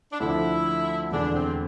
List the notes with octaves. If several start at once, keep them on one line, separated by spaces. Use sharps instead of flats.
D4
D2 D3 F3 E4
E1 E2 D3 D4
C4